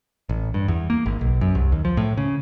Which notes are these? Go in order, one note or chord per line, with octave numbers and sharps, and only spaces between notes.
A1
G2
E2
A#3
G#1
B1
F#2
C2
D#2
F3
A2
C#3